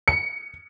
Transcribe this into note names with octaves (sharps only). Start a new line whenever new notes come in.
C#7